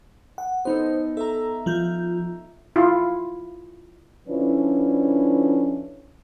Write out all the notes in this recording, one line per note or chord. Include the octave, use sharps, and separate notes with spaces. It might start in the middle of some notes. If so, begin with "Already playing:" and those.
F#5
B3 D#4 A4 C5
A4 E5 A#5
F3 F4 G6
E4 F4
D3 F3 C#4 D4 E4 B4